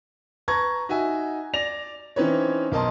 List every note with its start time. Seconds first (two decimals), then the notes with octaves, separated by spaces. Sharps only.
0.48 B4 A5 A#5 C#6 G#6 A#6
0.89 D#4 F#4 E5 G#5
1.54 D5 A#6 F7
2.16 E3 C4 C#4 D#4 B4 C#5
2.72 B1 A#4 D#5 A5 C6